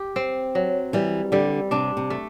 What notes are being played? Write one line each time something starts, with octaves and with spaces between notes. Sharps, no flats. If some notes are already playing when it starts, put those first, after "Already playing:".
Already playing: G4
C4
F#3
E3 G3
D3 G3
C3 D4
C3
A3